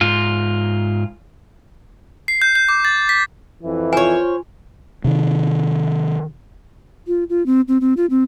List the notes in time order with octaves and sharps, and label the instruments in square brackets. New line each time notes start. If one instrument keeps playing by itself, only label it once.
[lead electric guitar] G#2 F4
[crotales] C7
G6
G6
D6
A6
B6
[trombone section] F2 E3
[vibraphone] F4 [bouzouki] C5 C#5 [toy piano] G#5
[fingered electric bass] C3 D#3
[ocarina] F4
F4
C4
C4
C4
F4
C4